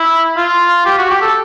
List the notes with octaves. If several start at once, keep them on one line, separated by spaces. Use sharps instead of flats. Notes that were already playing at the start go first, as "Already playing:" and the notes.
Already playing: E4
F4
G4
F#4
G4
A4